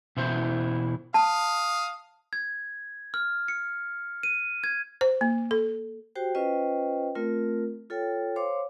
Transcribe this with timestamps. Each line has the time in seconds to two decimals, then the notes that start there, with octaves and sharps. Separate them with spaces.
0.17 B2 E3 E4 C5
1.14 F5 A5 D#6
2.33 G#6
3.14 F6
3.48 C#7
4.23 D#7
4.64 G#6
5.01 C5
5.21 A#3
5.51 A4
6.15 F#4 G4 C5 G5
6.35 C#4 F4 B4 C5 D#5 G5
7.15 A3 C4 F4 A#4
7.90 F4 A4 C#5 G5
8.36 C5 C#5 F5 C6 D6